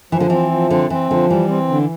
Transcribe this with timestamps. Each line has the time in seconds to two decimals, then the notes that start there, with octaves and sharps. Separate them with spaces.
0.12 E3 F3
0.20 D3
0.30 E3 C4
0.51 F3
0.70 D3 C4
0.90 E3 C4
1.10 D3 F3
1.30 E3 G3
1.49 C4
1.69 D3